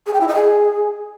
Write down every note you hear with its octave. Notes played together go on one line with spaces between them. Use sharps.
G#4
G5
E4
D#5
G#4